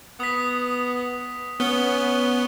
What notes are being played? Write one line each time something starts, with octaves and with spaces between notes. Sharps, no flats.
B3 D#6 B6
B3 C#4 G7